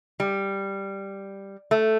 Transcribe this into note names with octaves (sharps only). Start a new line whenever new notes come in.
G3
A3